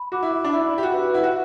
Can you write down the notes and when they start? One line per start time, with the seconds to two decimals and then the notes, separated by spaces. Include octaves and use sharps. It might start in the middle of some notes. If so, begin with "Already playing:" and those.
Already playing: B5
0.12 F#4 D6
0.23 E4
0.33 E5
0.45 D4
0.53 E4 B5
0.73 G4 E5
0.83 F#4
0.93 B4
1.13 E4 F#5
1.24 F#4